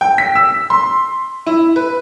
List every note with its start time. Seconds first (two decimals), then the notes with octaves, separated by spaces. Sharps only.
0.01 G5
0.18 B6
0.35 E6
0.70 C6
1.46 E4
1.76 B4